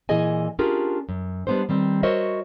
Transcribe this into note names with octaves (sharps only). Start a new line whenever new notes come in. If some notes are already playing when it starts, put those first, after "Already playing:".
A#2 E3 E4 G#4 D#5 G#5
C#4 D4 F4 G4 G#4 A#4
F#2
G3 G#3 B3 D4 C5
D#3 G3 C4
F#4 A#4 C5 C#5 D#5 E5